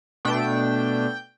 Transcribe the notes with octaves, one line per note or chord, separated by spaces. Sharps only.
B2 A3 D4 G5